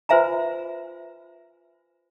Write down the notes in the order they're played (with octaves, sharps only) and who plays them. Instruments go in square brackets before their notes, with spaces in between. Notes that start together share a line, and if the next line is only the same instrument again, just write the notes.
[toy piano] F4 B4 C5 E5 G#5 A#5